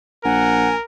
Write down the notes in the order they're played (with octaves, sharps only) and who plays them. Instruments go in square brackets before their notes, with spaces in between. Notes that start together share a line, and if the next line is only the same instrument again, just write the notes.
[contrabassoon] A#1 [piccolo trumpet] A#4 [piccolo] F#5 [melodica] G#5